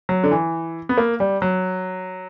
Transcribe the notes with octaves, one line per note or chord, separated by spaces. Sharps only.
F#3
D3
E3
B3
A#3
G3
F#3